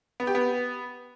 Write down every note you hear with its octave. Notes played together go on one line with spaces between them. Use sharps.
B3
G4
B3